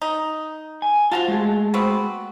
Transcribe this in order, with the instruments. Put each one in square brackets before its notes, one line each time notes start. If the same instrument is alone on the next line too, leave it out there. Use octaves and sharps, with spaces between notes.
[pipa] D#4
[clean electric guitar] G#5
[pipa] F3 F#4 A5 [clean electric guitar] F4 F5
[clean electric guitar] G#3 A3 G#4
[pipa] B3 C4 F#4